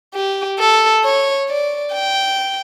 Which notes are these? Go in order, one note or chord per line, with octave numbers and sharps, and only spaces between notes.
G4
A4
C#5
D5
G5